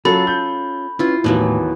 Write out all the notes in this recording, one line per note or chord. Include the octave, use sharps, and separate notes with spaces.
F#3 C#4 F4 A4 B5
G6
C#4 E4 F4 B4
D#2 A2 E3 F#3 B3